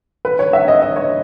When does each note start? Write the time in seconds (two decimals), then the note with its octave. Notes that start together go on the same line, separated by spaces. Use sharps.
0.25 B4
0.39 C#5
0.53 E5
0.68 D#5
0.82 D#5
0.96 C#5